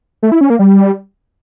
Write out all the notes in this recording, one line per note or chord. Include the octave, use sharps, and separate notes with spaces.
A3
E4
C#4
A#3
G3